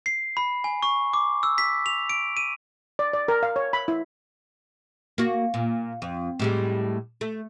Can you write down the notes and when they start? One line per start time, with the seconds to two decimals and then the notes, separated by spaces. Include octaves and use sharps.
0.06 C7
0.37 B5
0.64 G#5
0.83 C#6
1.13 D6
1.43 E6
1.58 B6
1.86 F7
2.09 D7
2.37 D#7
2.99 D5
3.13 D5
3.28 A#4
3.43 F5
3.56 C#5
3.73 B5
3.88 E4
5.18 A#3 F#4
5.54 A#2
6.02 F2
6.39 A2 G3 G#3
7.21 A3